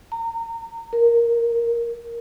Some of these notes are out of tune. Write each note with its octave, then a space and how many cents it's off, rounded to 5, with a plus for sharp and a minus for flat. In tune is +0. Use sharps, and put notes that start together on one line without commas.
A#5 -30
A#4 +5